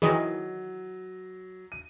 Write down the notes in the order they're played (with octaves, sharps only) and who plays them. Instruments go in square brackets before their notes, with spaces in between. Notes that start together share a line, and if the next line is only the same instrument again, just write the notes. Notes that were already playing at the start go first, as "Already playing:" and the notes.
[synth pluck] D#3 E3 [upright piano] F#3 [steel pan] G#4 D#5
[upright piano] D#7